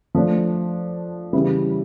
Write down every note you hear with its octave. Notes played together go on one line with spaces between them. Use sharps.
F3 A3 D4
C#3 E3 G3 B3 E4